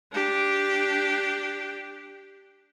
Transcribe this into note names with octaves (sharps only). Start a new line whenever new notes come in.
D4 G4